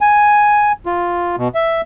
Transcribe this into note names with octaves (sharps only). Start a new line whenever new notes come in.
G#5
F4
B2
E5